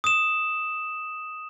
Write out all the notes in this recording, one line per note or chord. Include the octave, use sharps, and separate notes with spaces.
D#6 E7